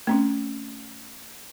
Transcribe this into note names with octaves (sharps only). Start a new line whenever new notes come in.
A3 C4 C#4